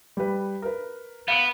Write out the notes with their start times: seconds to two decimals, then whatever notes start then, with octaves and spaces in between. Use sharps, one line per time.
0.17 G3 B4
0.62 A#4 B4
1.28 B3 F5 C#7 D7